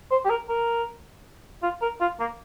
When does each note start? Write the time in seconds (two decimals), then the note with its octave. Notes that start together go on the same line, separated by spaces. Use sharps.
0.11 C5
0.25 G4
0.30 A#4
0.49 A#4
1.63 F4
1.82 A#4
2.01 F4
2.20 A#3